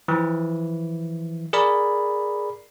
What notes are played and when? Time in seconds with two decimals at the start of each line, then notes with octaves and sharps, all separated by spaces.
0.08 E3 F3
1.53 G#4 A#4 D5 B5